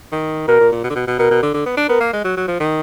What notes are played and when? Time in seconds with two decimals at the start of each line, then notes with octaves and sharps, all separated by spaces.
0.12 D#3
0.48 B2 A#4
0.60 A#2
0.72 A#2
0.84 B2
0.90 D3
0.95 B2
1.07 B2
1.19 B2 A#4
1.31 B2
1.42 D3
1.54 D3
1.66 B3
1.77 D4
1.89 B3 A#4
2.00 A#3
2.13 G#3
2.24 F#3
2.37 F#3
2.47 F3
2.60 D#3